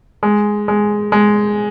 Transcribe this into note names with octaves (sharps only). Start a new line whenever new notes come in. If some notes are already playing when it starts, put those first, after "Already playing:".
G#3
G#3
G#3